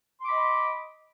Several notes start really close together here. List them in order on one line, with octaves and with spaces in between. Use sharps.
C6 D6 B5 D#5